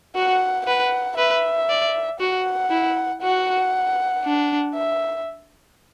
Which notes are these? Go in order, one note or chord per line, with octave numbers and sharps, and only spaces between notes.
F#4 F#5
B4 F#5
B4 E5
D5
F#4 F#5
E4
F#4 F#5
D4
E5